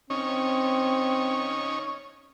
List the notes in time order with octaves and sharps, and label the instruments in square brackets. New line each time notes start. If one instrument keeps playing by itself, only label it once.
[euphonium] C4 [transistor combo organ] C#4 D#4 C#5